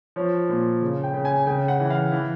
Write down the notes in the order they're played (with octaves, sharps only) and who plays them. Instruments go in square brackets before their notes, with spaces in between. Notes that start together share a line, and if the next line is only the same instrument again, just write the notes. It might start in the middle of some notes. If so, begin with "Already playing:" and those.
[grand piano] F3 C#5
A#2
C#3
G5
C#3
G#5
C#3 G5
F#5
E3
F5
E3